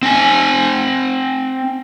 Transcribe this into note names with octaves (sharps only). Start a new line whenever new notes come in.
C4 G#5